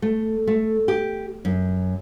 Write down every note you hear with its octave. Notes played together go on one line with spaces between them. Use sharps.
A3
A3
G4
F#2